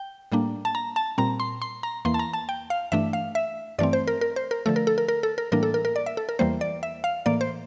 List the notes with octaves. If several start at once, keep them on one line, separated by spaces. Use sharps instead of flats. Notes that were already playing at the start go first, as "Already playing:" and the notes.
Already playing: G5
A2 G3 A#3 D4
A5
A#5
A5
A#2 G3 C4 A#5
C6
C6
A#5
E2 E3 A#3 C6
A5
A#5
A5
G5
F5
G2 E3 A3 D4 E5
F5
E5
G2 E3 A3 C4 D5
C5
A#4
A#4
C5
A#4
D3 F3 A3 A4
A#4
A4
A#4
A#4
A4
A#4
A2 E3 G3 A#3 D4 A#4
A4
A#4
A#4
D5
E5
A4
A#4
E2 E3 G3 A#3 C5
D5
E5
F5
A2 E3 A#3 D5
C5